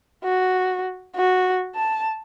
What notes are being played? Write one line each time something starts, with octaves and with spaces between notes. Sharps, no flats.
F#4
F#4
A5